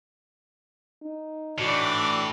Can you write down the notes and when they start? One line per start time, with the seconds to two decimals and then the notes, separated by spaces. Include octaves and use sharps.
1.03 D#4
1.59 A2 E3 D4 F#4 D5